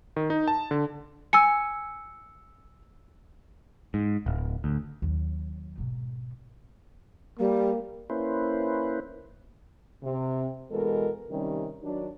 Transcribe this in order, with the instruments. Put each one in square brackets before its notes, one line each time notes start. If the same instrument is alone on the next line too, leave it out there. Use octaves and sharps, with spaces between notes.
[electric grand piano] D#3
D#4
A5
D3
[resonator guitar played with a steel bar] G#5 [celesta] E6 C#7
[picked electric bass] G#2
D1
D2
[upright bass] D#2 F#3
G#2 B2
[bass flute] G3 [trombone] A#3
[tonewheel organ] A#3 C#4 E4 B4 C5
[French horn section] C3
B2 E3 G#3 A4 A#4
C3 D#3 G3 C#4
D#3 F#3 D4